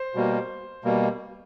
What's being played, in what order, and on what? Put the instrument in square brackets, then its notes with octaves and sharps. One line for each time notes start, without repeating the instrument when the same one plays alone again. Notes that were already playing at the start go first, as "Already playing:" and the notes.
Already playing: [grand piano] C5
[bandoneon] B2 G3 A#3
B2 G3 A#3